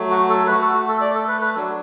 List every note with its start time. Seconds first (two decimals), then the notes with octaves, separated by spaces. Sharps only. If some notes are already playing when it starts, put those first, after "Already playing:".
Already playing: F#3 A3
0.10 F#4
0.29 A4
0.47 A3 F#4 B4
0.61 A4
0.74 F#4
0.88 A4
1.01 D5
1.15 A4
1.28 B4
1.41 B4
1.55 F#3 D4 F#4 A4